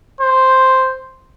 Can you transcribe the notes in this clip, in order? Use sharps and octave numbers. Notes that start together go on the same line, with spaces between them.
C5